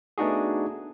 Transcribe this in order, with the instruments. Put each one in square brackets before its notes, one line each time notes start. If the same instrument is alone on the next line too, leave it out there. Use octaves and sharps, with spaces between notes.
[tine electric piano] A3 B3 D4 D#4 F#4 G#4